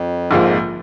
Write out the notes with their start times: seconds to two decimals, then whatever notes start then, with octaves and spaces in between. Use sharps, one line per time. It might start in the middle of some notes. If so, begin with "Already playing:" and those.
Already playing: F2
0.31 A#1 G#2 F3 A#3